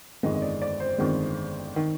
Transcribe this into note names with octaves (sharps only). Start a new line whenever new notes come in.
G1 F2 D#3 G#3 D#5
D#5
D5
D5
C5
G1 F2 D#3 G#3
D#3